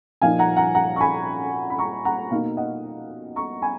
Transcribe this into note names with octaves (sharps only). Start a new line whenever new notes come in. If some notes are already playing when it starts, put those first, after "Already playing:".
A#2 F3 A#3 D#4 F5 G#5
F#5 A#5
F#5 A#5
F#5 A#5
C#6
G#5 B5
B5
A#5 C#6
F#5 A#5
B2 A#3 D#4 F5
D#5 F#5
A#5 C#6
G#5 B5